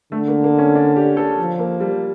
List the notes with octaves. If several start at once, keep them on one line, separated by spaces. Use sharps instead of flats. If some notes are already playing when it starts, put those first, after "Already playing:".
D3 A3
A#3
A#3
C#4
D4
G4
A4
F3
A#3
G3